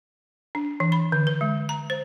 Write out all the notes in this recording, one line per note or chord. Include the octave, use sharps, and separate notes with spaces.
D4
E3
B5
D3
B4
G#3
A#5
C5